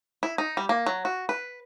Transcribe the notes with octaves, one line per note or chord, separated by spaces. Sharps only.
E4
D#4
G3
A#3
F#3
F#4
B4